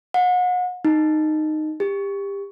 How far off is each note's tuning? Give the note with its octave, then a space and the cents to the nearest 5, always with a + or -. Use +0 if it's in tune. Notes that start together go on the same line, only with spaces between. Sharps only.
F#5 -35
D#4 -10
G4 +25